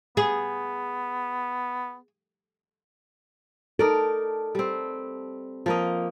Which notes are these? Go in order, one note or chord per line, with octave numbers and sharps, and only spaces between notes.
B3 G#4
D#4 A4 A#4 D5
G3 C4
F3 A#3 D#5